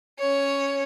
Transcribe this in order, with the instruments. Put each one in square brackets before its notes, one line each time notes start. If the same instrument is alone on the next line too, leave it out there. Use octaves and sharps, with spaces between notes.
[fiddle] C#4 C#5